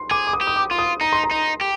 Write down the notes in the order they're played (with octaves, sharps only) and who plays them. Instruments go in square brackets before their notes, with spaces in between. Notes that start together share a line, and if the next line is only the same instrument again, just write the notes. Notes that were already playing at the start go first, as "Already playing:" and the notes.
Already playing: [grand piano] C6
[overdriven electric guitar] G#4 [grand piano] D6
[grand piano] D6
D#6
[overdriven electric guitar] G4
[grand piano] D#6
D6
[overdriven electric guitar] F4
[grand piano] D#6
[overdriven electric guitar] D#4 [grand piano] A#5
[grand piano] C6
A#5
[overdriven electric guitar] D#4
G4